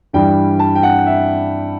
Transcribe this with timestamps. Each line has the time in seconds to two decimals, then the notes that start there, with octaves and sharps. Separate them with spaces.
0.13 G2 E3 G3 G5
0.59 A5
0.75 G5
0.83 F#5
1.06 E5